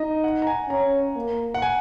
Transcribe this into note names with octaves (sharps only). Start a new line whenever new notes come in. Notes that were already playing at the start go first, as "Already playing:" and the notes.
Already playing: D#4 D#5
F#5
A#5
G#5
C#4 A#5
A#3
F#5
G#5